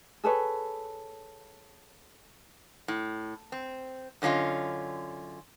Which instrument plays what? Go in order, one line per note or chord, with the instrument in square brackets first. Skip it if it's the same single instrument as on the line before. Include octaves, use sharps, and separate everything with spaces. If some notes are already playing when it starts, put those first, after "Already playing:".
[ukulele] G#4 A4 B4 C#5
[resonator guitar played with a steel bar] A2
C4
F#2 D3 C#4 F4 D#5